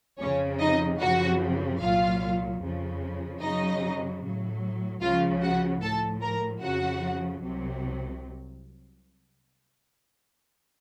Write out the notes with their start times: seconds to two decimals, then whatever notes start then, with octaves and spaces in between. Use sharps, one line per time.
0.19 F2 C#3 F3 C#4 C#5
0.60 D#4 D#5
1.00 F#2 C#3 F3 F#4 F#5
1.80 C2 A#2 F#3 F4 F5
2.61 F2 C#3 F3
3.41 F#2 C#3 F#3 D#4 D#5
4.21 A2 F#3
5.01 C#2 C#3 F3 F4 F5
5.42 F#4 F#5
5.81 A2 F3 A4 A5
6.22 A#4 A#5
6.62 F2 C#3 F3 F#4 F#5
7.42 C2 C3 F#3